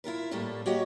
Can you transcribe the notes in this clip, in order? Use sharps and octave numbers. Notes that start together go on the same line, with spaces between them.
E4 F4 A#4 B4
A2 G3 A3 A#3
A#3 F#4 G4 C#5 D#5